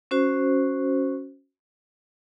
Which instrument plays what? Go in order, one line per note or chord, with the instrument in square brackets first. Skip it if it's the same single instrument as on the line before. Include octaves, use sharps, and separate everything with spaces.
[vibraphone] C#4 F#4 C5